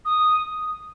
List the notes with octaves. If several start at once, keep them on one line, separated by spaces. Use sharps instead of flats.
D#6